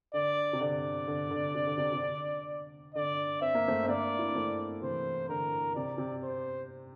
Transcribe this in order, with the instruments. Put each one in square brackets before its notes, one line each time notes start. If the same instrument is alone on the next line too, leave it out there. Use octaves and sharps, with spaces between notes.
[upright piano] D3 [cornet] D5
[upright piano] C3
[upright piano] D3 [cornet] D5
[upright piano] D3
D3
C3
D3
C3
C3
D3
[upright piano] D3 [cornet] D5
[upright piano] C4 [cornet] E5
[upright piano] A#3
A3 C4
C4
[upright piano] A#3 D4 [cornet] D5
[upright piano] E4
D4
A3 C4
[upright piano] C3 E3 [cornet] C5
[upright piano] D3 [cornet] A#4
[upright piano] C3 [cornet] D5
[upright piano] C3
[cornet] C5